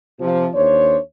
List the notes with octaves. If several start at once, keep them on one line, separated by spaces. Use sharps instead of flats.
C3 F3
D#2 D4 C5 C#5